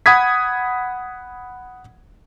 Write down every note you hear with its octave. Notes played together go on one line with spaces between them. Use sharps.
F#5 B5 D#6 G#6 B6